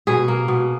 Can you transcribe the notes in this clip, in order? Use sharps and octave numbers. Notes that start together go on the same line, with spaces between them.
B2 G#4
A#3
B2